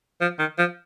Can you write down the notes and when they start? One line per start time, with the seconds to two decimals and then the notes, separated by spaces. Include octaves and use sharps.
0.21 F3
0.39 D#3
0.59 F3